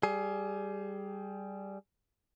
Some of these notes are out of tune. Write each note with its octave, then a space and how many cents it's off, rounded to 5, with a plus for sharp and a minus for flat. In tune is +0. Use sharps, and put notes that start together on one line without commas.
G3 +0 G#4 +20